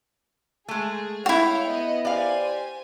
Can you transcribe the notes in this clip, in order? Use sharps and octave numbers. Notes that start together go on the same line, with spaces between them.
G#3 A3 G#4
E4 F#4 C#5 F5 G5
B3 D#5
G4 C5 D5 F5 G#5